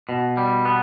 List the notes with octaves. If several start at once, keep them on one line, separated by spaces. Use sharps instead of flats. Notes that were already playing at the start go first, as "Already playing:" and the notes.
B2
G3
B3